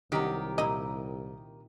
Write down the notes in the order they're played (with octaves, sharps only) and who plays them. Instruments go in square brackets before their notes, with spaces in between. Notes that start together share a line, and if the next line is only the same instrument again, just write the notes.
[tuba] C2 [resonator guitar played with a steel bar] D#3 G4 [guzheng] F#3 F#4
[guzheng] A#2 D#4 E4 [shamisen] D#5